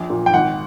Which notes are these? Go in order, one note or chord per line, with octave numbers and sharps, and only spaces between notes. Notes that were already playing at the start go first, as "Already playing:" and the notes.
Already playing: A#1
A#2
G5
G#1 F#5